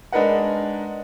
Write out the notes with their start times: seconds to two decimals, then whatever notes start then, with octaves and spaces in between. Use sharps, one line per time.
0.12 G#3 D4 D#4 A#4 B4 F#5